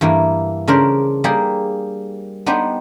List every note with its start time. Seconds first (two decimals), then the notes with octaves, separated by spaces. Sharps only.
0.01 G2 E3 A#3 E4
0.68 C#3 D4 A#4 C5
1.24 G3 A#3 G4 G#4
2.46 B3 D4 D#4 G4 C5